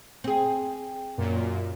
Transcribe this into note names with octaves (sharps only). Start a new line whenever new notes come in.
C4 G#4
F#2 A#2